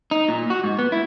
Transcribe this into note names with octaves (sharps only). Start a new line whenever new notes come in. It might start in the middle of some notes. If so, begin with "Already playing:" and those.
D#4
A#2
F#4
G#2
B3
E4